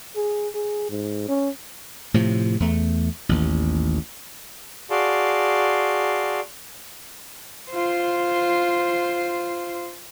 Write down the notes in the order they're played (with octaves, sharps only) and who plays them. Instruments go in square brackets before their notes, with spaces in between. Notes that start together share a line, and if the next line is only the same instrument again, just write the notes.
[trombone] G#4
G#4
G#2
C#4
[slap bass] A2 C3 F3
E2 A3
A1 D#2
[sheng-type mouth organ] F#4 G#4 D5 F5 A5 C6
[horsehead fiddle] F4 C5